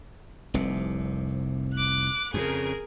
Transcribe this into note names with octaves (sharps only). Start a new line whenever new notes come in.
F1 C2 C3
D6 F#6
F2 C#3 G#4 A#4